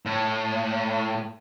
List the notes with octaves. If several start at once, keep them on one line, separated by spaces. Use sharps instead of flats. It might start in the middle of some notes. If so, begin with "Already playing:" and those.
A2